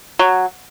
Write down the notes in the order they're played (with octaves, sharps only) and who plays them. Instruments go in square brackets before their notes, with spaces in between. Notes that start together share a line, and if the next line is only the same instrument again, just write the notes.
[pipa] F#3